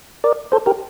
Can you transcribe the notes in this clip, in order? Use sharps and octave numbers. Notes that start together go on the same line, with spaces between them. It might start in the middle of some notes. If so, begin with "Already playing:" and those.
A#4 D5
A4 C5
G4 A#4